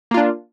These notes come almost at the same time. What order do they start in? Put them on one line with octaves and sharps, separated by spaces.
A#3 F4 D4